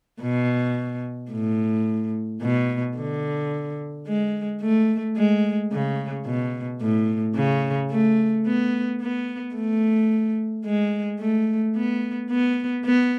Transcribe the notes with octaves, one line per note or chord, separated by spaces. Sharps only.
B2
A2
B2
D3
G#3
A3
G#3
C#3
B2
A2
C#3
A3
B3
B3
A3
G#3
A3
B3
B3
B3